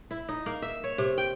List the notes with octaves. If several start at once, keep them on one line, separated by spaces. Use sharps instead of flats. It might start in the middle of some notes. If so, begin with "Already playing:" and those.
E4
D#4
A#3
E5
C#5
C3
G5